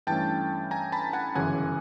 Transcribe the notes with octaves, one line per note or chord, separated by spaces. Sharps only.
G2 E3 A3 C#4 G5 A5
G#5 A#5
A5 B5
F#5 G#5
G1 F#2 C#3 E3 F#5 G#5